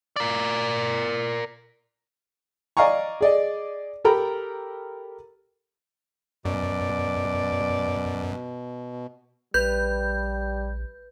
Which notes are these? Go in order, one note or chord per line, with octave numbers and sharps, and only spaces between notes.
A#4 D5
D5 D#5 F5 G#5 A#5 C#6
G#4 D5 D#5
G4 A4 A#4 G5 A#5 B5
F#2 B2 D5
A#1 G3 B4 G6